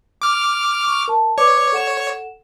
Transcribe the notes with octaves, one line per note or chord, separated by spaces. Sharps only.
D6 F6
C#6
A#4 A5
B4 C#5 D5 D6
A4 F#5 E7